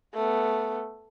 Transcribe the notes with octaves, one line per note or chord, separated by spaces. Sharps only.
A3 B3